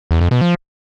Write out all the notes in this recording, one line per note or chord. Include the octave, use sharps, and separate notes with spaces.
E2
F2
B2
F3